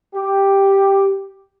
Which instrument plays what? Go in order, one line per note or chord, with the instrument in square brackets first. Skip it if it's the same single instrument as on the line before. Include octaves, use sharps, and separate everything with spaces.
[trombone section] G4